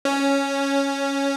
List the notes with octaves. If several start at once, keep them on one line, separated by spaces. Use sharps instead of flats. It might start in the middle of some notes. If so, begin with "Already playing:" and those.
C#4